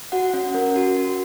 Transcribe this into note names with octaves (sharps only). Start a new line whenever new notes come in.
F#4 F#5
C#4 F#5
C#4 A#4
F#4
F#4